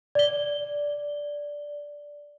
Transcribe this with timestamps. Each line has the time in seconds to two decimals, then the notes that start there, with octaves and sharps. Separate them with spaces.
0.15 D5 G7